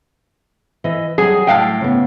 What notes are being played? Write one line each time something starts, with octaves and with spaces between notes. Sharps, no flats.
E3 D#5 E5
F#3 G3 G#4
A2 F5 G5
C#3 B3